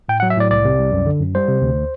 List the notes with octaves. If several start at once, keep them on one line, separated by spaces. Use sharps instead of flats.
A2 G5
F#5
F#3
E5
A2 D5
C2 D5
C3
C2
F#2
D3
F#2
G3 C5
C3
D2